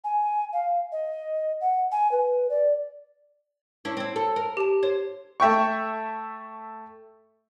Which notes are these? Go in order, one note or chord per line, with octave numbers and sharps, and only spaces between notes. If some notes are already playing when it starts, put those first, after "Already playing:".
G#5
F5
D#5
F#5
G#5
B4
D5
C#4 D4 E4
C4 E4
A4
A#4
G4 A5
C5 C#5
A3 E5 G5 C#6